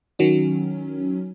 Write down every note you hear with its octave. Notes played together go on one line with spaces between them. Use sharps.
D#3 F#3 C#4